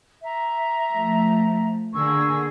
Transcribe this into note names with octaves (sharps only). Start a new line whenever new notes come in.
E5 A#5
F3 A3
D3 A#3 G#4 C#6 E6